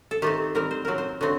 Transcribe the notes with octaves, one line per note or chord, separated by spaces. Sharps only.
A4
D#3 A3 C4 G4
D#3 G3 C4 A#4
C5
A#2 F#3 C4 A#4
C5
D3 F#3 A3 C4